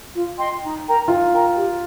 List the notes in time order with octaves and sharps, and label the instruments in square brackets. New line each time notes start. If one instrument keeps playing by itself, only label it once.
[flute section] F4
D#5 G5 C6
D#4
A#4 G5 A#5
[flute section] D#4 [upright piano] F4
[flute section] A#4 G5 A#5
G4